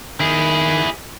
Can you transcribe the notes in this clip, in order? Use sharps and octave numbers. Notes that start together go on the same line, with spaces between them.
D#3 E4 G#4